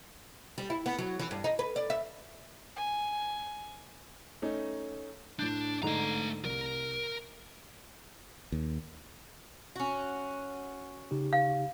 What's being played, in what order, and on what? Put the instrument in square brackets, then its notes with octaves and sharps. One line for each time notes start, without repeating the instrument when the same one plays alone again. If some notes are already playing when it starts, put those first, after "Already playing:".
[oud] G3
E4
B3
F#3
E3
G2
D#4
B4
D5
E5
[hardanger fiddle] G#5
[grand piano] A3 C#4 D#4
[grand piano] A2 G6 [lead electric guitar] D4
[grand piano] G#2 D3 D#4 [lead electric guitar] A3 A#5
[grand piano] C2 [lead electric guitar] A#4
[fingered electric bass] D#2
[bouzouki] C#4 F#4
[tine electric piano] C#3 D#4 G4
[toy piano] F5